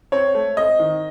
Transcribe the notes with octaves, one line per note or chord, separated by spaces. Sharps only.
C4 C#5
A3
C4 D#5
D#3